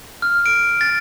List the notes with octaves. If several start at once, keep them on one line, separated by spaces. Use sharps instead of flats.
F6
D7
A6